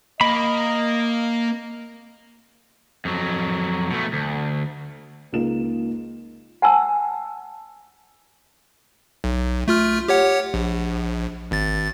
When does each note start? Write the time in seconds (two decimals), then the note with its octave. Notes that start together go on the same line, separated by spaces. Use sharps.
0.21 A#3 D#5 B5
3.05 F2 F#3
3.90 B2 A3
4.13 D2
5.32 C#2 A#3 D#4 F4 E7
6.62 F#5 G#5 A5 E6
9.24 B1
9.68 A3 F4 F6
10.08 G4 C#5 F#5
10.54 A#1
11.51 G#1 A6